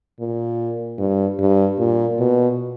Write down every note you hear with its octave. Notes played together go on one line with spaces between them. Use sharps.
A#2
G2
G2
A#2
B2